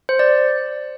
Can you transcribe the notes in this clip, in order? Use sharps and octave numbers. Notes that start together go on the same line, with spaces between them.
C5
D5